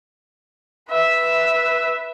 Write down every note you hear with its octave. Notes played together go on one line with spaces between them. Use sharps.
B4 E5